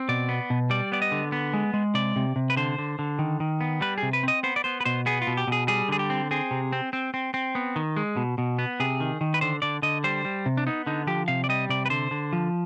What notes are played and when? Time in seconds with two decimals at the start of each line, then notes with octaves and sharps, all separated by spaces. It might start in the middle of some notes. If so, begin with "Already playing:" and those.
Already playing: C4
0.09 B2 D5
0.29 B3
0.50 B2
0.70 G3 D5
0.92 B3 D5
1.02 D#5
1.12 D3
1.32 B3
1.54 G#3
1.74 G#3
1.94 C3 D5
2.16 C3
2.36 C3
2.50 B4
2.57 D3 C5
2.78 D3
2.99 D3
3.19 D#3
3.40 D#3
3.61 B3
3.81 G3 B4
3.98 G#4
4.03 C3
4.13 B4
4.23 C4 D#5
4.43 B3 C5
4.56 D5
4.64 B3 C5
4.80 B4
4.85 B2 C5
5.06 B3 G#4
5.22 F4
5.27 B2
5.37 G4
5.47 B2 G#4
5.68 G3 G#4
5.89 D3 G#4
5.99 G4
6.10 C4
6.31 C4 G#4
6.51 C3
6.73 C4
6.93 C4
7.14 C4
7.34 C4
7.55 B3
7.76 D#3
7.97 G#3
8.17 B2
8.38 B2
8.59 B3
8.80 C3 G#4
9.00 D#3
9.21 D#3
9.34 B4
9.41 D3 C5
9.62 D3 D5
9.82 D3 D#5
10.04 G3 C5
10.25 G3
10.46 C3
10.57 D4
10.67 B3 D#4
10.86 D3 D#4
11.07 F3 G4
11.28 C3 F5
11.44 D5
11.49 G3 D#5
11.69 C3 D5
11.86 B4
11.90 D3 C5
12.11 D3
12.33 F3